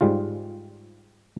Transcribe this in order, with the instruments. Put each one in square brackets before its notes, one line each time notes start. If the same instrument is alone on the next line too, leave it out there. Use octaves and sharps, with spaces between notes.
[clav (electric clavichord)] G#2 G3 G#3 F4